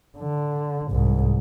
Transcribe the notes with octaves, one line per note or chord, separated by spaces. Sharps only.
D3
C2 G#2